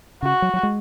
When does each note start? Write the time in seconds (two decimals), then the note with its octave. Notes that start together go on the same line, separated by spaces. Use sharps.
0.23 C#3 F#4
0.42 F#3
0.54 F#3
0.63 G#3